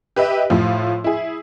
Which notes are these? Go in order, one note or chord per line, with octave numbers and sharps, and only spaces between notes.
G4 B4 D#5 E5
A2 F3
E4 G#4